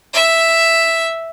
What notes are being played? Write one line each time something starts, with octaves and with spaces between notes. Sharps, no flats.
E5